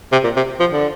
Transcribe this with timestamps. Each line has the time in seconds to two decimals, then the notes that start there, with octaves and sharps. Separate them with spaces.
0.12 C3
0.24 A#2
0.36 C3
0.60 F3
0.72 D3